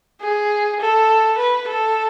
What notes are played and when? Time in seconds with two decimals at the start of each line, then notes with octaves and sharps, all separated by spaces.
0.21 G#4
0.80 A4
1.38 B4
1.68 A4